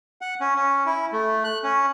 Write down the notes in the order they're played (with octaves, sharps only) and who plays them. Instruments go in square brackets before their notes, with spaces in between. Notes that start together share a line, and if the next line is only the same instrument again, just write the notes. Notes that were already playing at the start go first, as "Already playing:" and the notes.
[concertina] F#5
C#4
C#4
E4
A3
F#6
C#4